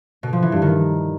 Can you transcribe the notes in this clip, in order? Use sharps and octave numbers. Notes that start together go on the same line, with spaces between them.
B2
F3
E3
G2
D#3